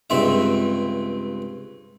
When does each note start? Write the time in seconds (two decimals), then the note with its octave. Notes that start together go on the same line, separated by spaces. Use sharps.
0.10 C#2 G2 C4 E5